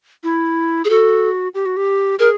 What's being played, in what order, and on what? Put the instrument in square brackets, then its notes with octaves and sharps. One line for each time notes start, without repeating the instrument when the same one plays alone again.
[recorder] E4
[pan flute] G#4
[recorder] F#4 [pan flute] A4
[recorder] G4
F#4
G4
[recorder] G#4 [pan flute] A#4